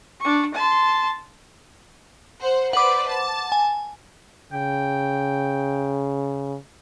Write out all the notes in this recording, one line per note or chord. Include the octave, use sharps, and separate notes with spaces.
D4 C#6
A5 C6
C5 F#5
B4 C5 D5 F#5 D6
A5
G#5
C#3 G5